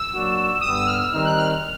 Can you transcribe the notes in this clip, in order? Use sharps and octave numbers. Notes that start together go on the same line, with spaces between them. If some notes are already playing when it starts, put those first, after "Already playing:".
Already playing: E6
F#3 A#3 D4 F#4
G2 D3 G3 B3 D#6
E6
F6
E6
D#3 G3 C4 D#4 F6
F#6
F6
F6